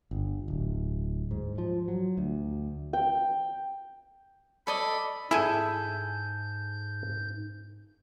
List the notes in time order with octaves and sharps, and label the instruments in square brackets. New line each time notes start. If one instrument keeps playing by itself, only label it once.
[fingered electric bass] G1
D1
G#2
F3
F#3
D2
[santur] G5
[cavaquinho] A4 D5 D#5 [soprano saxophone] B5
[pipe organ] G#2 G6 [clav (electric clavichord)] E4 G#5 [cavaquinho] G#4 A4